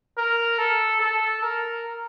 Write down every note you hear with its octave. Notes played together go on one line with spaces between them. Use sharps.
A#4
A4
A4
A#4